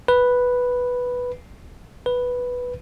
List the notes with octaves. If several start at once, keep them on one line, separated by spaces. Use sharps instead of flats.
B4
B4